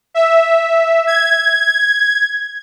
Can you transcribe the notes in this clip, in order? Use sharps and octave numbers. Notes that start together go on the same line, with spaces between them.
E5
G#6